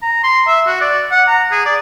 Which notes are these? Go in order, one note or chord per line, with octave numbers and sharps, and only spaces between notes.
A#5
C6
E5
F#4
D5
F#5
A#5
G#4
D5